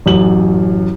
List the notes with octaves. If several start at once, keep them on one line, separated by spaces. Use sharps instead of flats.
A1 F#2 F#7